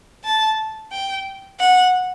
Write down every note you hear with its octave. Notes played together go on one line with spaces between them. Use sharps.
A5
G5
F#5